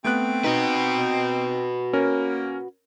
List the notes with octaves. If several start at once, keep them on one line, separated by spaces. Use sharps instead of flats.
A3 B3 C4 F#6
D#4 F#4 B4
A#3 C#4 A#4